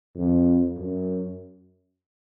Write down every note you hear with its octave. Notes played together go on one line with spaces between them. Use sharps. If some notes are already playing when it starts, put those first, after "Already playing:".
F2
F#2